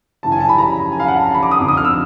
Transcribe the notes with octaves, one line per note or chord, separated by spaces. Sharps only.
F#2 C#3 E3 A5
G#5
A5
B5
A#5
G#5
F5
F#5
A5
A#5
B5
D6
D#6
F2 D3 D6
D#6
F6
E6